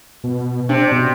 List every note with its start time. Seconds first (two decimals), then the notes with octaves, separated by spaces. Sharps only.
0.24 B2
0.69 C3 D4
0.92 B2